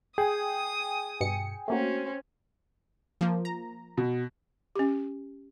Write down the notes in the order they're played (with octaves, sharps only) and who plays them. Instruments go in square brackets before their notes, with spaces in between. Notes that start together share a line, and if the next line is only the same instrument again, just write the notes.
[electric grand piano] G#4 [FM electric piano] G5 G#5 [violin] D#6
[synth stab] G2 B2 C#7
[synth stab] A3 A#3 F#4 [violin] C4 C#4
[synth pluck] F3 A#3
A#5
[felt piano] B2
[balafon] C#4 G4